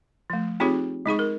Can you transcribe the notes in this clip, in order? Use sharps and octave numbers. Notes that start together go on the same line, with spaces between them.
F3 A3
C4 D#4 F4 G4 G#4 C#5
G#3 D#4 G#4 C#6
A#4